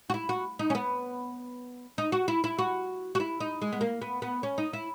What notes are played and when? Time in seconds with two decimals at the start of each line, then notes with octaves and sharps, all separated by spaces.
0.10 F#4
0.14 E4
0.29 F#4
0.59 D#4
0.70 C#4
0.75 B3
1.98 D#4
2.12 F#4
2.28 E4
2.44 E4
2.59 F#4
3.15 F#4
3.20 E4
3.40 D#4
3.61 G#3
3.73 B3
3.81 A#3
4.02 B3
4.22 B3
4.43 C#4
4.58 D#4
4.73 E4